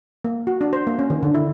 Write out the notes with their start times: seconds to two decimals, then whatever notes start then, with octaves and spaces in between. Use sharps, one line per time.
0.24 A#3
0.47 F#4
0.61 D4
0.73 C5
0.87 A#3
0.99 C#4
1.10 D#3
1.23 D3
1.34 E4